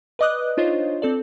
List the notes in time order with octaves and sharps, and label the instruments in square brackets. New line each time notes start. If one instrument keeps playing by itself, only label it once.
[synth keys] B4 D5 D#5 D6 D#6 F#6
D4 D#4 F4 C5 C#5 D#5
C4 A4 D5